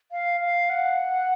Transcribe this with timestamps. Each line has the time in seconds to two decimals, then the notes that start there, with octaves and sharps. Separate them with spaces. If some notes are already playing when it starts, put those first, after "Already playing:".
0.12 F5
0.41 F5
0.70 F#5